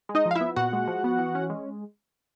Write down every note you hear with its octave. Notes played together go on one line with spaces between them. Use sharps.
G#3
D#4 D#5
F3
F5
E4 E5
B3
A#2 F#4 F#5
G#3
F3
B3
E3
C#4
G#3